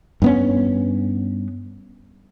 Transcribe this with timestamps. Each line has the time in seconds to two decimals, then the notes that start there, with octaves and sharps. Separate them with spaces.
0.22 G2 B3 C#4